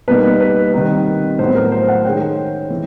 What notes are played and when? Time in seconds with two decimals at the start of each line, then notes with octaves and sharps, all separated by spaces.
0.08 B2 G3 A#3 D#4 B4
0.40 B4
0.73 D#3 G3 C4 D#4
1.38 A2 F#3 B3 C5
1.55 A#4
1.72 C5
1.88 F#5
2.05 D#3 G#3 C#4 G5
2.70 E3